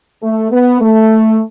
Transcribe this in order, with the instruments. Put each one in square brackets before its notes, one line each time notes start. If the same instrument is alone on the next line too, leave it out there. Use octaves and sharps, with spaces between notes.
[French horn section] A3
B3
A3